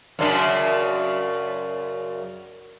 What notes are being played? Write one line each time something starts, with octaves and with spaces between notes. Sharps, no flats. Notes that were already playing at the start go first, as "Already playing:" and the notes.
F#2 C#3 D4